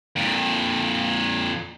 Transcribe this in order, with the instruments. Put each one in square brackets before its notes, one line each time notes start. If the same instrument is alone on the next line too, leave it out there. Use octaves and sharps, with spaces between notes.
[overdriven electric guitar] F2 A#2